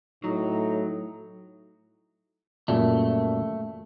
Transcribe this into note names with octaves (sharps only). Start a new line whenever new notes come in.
A2 F#3 D#4
F#2 A#2 G3 A3